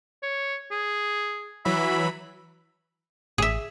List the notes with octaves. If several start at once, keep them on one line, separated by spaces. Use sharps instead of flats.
C#5
G#4
E3 F#3 E5 B5
A1 G#4 E5